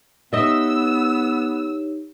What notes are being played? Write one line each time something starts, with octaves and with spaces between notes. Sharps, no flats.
B3 D#4 G4 C#5 D#5 E5 E6